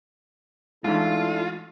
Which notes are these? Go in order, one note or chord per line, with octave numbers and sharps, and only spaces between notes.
A1 G#2 D4 E4 F4 A4